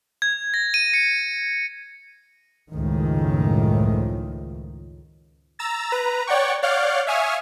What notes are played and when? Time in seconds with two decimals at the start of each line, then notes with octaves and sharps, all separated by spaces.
0.22 G#6
0.54 A#6
0.74 D#7
0.94 C#7
2.71 C#2 F#2 A2 D#3 F3
5.59 A#5 E6 A6
5.92 B4 A#5
6.27 C#5 D5 F#5 G5 C#6
6.63 C#5 D5 F5 F#5 F6 G6
7.07 E5 F5 G#5 C#6 D#6 F6